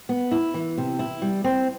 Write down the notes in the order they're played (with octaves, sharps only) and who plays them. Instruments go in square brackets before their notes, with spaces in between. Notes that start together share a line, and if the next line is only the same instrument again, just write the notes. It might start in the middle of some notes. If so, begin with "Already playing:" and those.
[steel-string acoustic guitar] B3
E4
E3
C3
E4
G3
C4